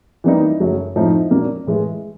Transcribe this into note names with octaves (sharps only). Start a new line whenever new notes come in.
E3 G3 A#3 D#4
F#2 C#3 F#3 A3
A2 F3 A3 C4 D#4
A#2 F#3 A#3 D4
A2 E3 G#3